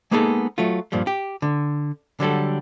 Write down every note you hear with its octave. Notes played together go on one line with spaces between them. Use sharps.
G#3 A#3 B3 D#4 G#4 A4
F#3 A3 F4
G2 A#2 F3 G3
G4
D3
D3 F#3 G3 A4